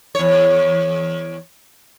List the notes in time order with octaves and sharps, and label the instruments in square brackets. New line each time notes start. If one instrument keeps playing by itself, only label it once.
[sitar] E2 C#5